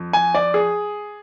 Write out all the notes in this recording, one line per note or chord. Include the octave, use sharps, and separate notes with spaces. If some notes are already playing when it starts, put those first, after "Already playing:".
Already playing: F2
G#5
D5
G#4